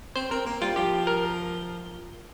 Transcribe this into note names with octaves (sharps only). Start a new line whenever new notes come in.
C4 C5
C4 A#4
A#3
G3 F4
F3 G4
A#4